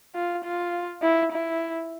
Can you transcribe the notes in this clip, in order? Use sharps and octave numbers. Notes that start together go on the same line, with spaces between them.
F4
F4
E4
E4